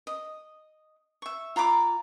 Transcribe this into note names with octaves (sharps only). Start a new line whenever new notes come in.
D#5
E5 C#6
F4 A#5 B5 D6